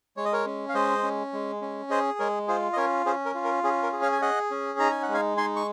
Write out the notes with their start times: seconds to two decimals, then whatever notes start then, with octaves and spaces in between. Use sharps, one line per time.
0.17 G#3 C#5
0.25 D#5
0.33 A#4 C#5
0.46 C#4
0.69 F5
0.74 G#3 C5 D#5
1.03 C#4
1.33 G#3
1.62 C#4
1.90 G#4 C5 D#5
2.19 G#3 A#4 C#5
2.48 F4 G#4 C5
2.73 D#5
2.77 C#4 A#4 C#5
3.06 C#4 G#4 C5
3.26 A#4
3.35 F4
3.44 A#4
3.64 C#4 G#4
3.83 A#4
3.93 G#4
4.02 C#5 F5
4.12 G#5
4.22 G#4 D#5 F#5
4.51 C#4
4.79 D#4 A#5
4.91 G#5
5.02 F#5
5.08 G#3
5.14 F5 G#5
5.37 D#4 G#5 C6
5.56 C#6